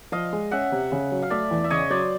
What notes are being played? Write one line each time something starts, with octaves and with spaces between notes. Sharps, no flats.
F3 D#5 F5
G#3
C#4 E5 F#5
C3
C#3
F#3
F5
A3 D5 E5
E2
E5
C#3 C#5 D#5
F#3 C5 D5